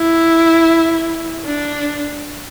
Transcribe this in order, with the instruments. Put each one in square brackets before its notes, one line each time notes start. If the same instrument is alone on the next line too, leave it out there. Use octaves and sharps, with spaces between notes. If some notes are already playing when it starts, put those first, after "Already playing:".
Already playing: [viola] E4
D4